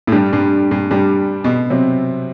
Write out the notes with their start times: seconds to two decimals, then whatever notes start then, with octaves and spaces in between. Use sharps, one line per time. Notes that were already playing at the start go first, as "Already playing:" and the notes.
0.07 A2
0.12 G2 G3 D4 G4
0.33 G2
0.71 G2
0.91 G2 G3 D4 G4
1.44 B2
1.70 C3 F#3 C4